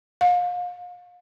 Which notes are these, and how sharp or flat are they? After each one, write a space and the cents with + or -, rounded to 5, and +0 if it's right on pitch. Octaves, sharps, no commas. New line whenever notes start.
F5 +35